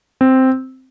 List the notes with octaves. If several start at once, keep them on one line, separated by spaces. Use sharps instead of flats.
C4